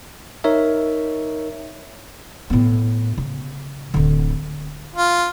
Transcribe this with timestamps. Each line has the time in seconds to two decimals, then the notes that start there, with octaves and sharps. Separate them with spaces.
0.44 D#4 A#4 C#5 E5
2.50 A2 B3
3.18 C#3
3.94 D1 D3
4.95 F4